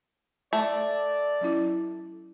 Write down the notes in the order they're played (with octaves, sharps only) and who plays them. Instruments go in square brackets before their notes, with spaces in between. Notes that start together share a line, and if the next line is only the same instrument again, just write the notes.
[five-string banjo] A3 [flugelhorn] D5
[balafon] F#3 C#4 E4